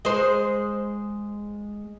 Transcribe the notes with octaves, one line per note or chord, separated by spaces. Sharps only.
G#3 C5